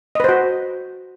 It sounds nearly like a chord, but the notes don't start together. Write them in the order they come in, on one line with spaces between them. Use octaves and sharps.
D#5 B4 C5 F#4